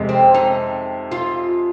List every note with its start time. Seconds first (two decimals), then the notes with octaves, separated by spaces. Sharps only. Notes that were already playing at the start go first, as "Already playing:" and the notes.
Already playing: F2 C3 G#3
0.09 C4
0.34 D#4
1.11 F4